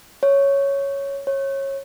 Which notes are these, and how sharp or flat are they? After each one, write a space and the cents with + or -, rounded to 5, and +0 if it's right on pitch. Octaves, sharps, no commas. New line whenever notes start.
C#5 +0
C#5 -20